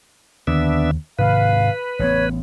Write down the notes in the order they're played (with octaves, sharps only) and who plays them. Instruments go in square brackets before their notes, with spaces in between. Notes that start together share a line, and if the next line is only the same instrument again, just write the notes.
[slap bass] D#2 D3 [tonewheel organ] B3 D4 E5
[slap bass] G#2 C3 D#3 [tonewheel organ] B4 [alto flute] F5
[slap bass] A1 B3 [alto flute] C#5